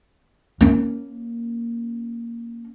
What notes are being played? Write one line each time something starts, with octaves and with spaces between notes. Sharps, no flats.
A#3 C#4